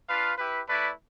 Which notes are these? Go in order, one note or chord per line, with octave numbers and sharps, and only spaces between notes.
D4 F4 B4 F5
E4 G4 B4
A3 E4 B4 D5